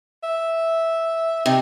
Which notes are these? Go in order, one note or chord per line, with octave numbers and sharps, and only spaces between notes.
E5
C3 D#4